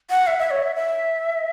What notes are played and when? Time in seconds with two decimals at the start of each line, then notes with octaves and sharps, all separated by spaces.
0.10 F#5
0.27 E5
0.39 E5
0.50 C#5
0.63 E5
0.76 E5